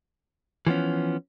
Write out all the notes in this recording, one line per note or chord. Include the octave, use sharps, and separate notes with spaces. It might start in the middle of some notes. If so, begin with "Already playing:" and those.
E3 F3 B3 C#4